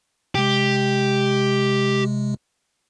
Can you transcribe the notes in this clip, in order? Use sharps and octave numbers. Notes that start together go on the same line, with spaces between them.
C3 G#3 G4